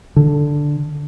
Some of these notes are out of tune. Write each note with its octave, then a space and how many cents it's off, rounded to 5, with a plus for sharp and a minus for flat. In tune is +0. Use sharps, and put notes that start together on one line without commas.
D3 +0